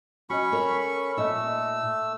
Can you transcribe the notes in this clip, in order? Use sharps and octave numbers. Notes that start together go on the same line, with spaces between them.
C#4 F#4 D#5 B5 C#6
A4 A#4 C#5
A#2 A3 D#4 D#5 E6